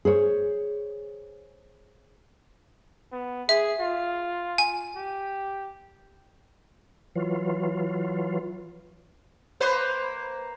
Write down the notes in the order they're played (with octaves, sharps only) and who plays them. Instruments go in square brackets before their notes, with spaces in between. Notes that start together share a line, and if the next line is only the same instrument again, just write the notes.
[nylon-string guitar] G#4 C5 C#5
[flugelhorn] B3
[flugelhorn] G#4 [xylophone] E5
[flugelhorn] F4
[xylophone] G#5
[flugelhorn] G4
[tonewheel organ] E3 F#3 F4
[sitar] A#3 B4 C5